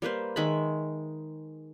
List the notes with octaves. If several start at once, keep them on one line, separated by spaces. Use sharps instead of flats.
G3 A#3 B4 C5
D#3 G#3 E5 B5